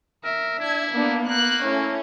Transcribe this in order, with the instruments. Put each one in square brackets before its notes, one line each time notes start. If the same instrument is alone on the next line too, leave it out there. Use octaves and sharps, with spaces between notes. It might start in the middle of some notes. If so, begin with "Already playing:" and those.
[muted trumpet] A#4 [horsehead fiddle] E5
[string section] D4 G#6 [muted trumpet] E4
[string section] A#3 D4 [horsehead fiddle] B3
[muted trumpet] A#3 [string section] F#6
[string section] A3 C#4 [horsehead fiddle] E4